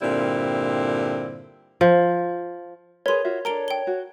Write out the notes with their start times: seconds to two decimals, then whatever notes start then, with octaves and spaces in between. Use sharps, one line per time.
0.02 G2 A#2 D3 G3 C4 E4
1.81 F3
3.06 G#4 A#4 B4 C#5 C6
3.24 F4 F#4 E5
3.45 D4 A4 A#4 A#5 D7 G7
3.68 G5 G7
3.87 F#4